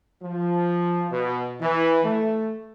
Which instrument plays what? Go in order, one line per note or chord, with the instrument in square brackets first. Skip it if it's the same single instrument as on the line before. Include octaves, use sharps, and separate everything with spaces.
[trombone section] F3
B2
E3
A3